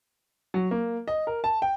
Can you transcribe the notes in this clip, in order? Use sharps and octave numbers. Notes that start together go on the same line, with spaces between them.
F#3
A#3
D#5
A#4
A5
G5